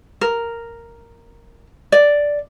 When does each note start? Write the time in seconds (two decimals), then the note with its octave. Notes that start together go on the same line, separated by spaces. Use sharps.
0.21 A#4
1.92 D5